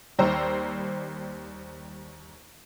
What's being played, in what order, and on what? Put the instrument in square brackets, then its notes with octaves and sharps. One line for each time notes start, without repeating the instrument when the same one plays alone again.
[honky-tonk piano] D#2 G3 C5 A#5 E6